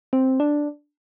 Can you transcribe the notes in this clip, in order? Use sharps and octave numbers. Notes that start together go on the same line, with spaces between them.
C4
D4